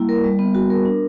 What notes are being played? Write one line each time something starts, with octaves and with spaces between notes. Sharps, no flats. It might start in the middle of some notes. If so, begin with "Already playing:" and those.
Already playing: G3 A#3 E4
A#4
G3
B3
F#4
A#4
D4